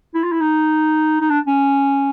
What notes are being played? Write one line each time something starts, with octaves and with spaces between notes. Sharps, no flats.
E4
F4
E4
D#4
D#4
D4
C#4